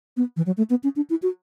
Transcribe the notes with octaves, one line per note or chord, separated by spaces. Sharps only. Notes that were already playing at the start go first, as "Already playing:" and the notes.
B3
E3
F#3
A3
B3
C#4
D4
E4
F#4